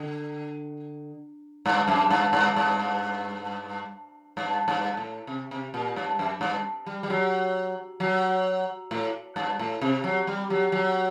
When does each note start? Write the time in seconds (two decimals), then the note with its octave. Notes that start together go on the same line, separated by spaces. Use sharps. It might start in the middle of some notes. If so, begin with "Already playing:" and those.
Already playing: D3
1.66 G2
1.88 F#2
2.10 G2
2.33 G2
2.56 G2
4.37 G2
4.68 G2
4.97 A2
5.27 C3
5.51 C3
5.74 A#2
5.96 G2
6.19 F#2
6.41 G2
6.86 G3
7.03 G3
7.10 F#3
8.00 F#3
8.91 A2
9.36 G2
9.59 A2
9.82 C3
10.04 F#3
10.27 G3
10.50 F#3
10.72 F#3